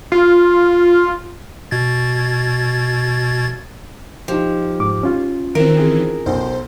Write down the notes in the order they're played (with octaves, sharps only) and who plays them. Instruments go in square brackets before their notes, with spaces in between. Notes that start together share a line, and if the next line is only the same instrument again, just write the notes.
[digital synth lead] F4
[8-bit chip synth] B2 G#6 A6
[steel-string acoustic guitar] F3 [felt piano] D#4 G4
[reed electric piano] G#2 D6
C#4 F4
[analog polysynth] D#3 E3 C4 [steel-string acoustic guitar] A#4 [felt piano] D7
[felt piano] G#4
[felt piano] B1 [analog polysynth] C5